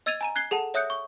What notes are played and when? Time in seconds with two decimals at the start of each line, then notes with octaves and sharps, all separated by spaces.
0.06 D#5 E6 G#6 A6 D#7 F7
0.21 G#5 A#5 D#7
0.36 F#6 G#6 C7 G7
0.51 G#4 A4 F#5 A5
0.74 C#5 E5 D#6 F#6 G6 C#7
0.90 C#6